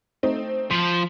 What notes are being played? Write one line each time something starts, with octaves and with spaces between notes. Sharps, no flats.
A3 C4 D#4
F3 C5 B6